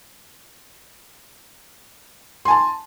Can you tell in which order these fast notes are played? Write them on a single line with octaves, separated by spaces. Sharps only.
C6 G#5 A5